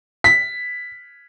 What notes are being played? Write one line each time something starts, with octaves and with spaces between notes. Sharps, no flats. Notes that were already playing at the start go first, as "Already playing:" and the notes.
B6